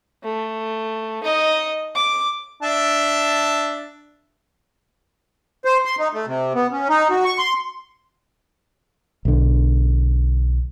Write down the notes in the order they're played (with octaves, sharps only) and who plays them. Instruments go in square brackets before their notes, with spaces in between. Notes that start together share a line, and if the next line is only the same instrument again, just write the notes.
[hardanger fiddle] A3
D#4 D#5
D6
[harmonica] D4 E5 A5
[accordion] C5
C6
D#4
A3
C3
B3
C#4
D#4
F#4
C#6
C6
[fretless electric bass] B1 D3